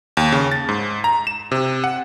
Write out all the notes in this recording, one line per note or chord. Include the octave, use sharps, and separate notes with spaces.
D#2
C#3
A6
G#2
A#5
E7
C3
F#5